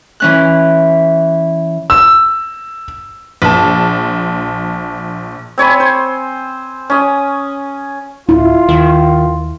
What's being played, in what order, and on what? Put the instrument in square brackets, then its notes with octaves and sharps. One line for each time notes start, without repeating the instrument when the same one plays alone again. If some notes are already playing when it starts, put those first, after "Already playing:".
[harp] E3 C#4 F#6
[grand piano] E6
[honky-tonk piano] A#1 A5
[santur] C4 C#5 G#5 B5
C5
C#4 D#6
[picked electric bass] D1 [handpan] E4 [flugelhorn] F4
[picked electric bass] D#2 [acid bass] D#3